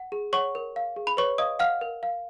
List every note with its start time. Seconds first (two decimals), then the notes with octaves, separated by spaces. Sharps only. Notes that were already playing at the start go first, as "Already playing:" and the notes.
Already playing: F#5
0.12 G#4
0.33 C#5 F#5 C#6
0.55 A#4
0.76 F5
0.96 G#4
1.07 B5
1.17 B4 C#5 C#6
1.38 D#5 F5 D#6
1.59 F5 F#5 F6
1.81 A#4
2.03 F5